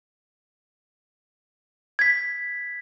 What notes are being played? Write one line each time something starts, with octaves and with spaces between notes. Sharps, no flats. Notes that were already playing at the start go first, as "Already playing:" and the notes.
G#6 B6